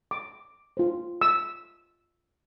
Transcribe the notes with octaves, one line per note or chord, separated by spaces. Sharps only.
D6
F4 C5
E6